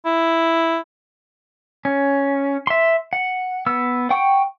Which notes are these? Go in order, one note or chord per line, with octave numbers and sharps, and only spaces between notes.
E4
C#4
E5 C6
F#5
B3 E6
F#5 G5 C#6